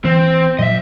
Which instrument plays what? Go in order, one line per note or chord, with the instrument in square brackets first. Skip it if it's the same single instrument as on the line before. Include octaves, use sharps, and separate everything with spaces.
[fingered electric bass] E3 [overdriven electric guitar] C4
[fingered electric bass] A#2 F#3 [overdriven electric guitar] D#5 E5